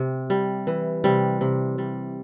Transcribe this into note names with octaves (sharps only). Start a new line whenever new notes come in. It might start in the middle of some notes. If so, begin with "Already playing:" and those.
Already playing: C3
G3
E3
C3 G3
C3
G3